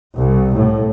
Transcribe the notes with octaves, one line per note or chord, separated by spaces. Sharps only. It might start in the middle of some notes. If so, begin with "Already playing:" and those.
C2
A2